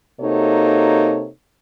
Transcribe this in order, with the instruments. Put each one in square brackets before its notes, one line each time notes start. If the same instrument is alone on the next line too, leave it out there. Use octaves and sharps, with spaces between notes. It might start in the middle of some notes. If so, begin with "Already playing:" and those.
[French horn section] C3 A#3 D#4 F#4 A4 C#5